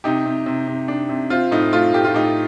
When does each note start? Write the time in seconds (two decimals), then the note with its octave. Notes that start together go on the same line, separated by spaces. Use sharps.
0.04 C3 D#4 G4
0.26 C3
0.46 C3
0.68 C3
0.88 D4
1.09 C3
1.30 C4 F4
1.51 A2 D#4
1.73 A3 F4
1.93 A2 G4
2.05 F4
2.14 A2 D#4 G4